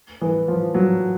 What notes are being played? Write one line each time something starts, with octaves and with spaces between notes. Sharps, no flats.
E3
F3
F#3